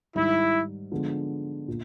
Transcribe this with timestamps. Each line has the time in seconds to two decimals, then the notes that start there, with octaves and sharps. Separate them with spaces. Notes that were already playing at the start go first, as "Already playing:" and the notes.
0.15 G#2 D#3 G3 E4
0.92 D3 F3 G#3 B3
1.68 A#2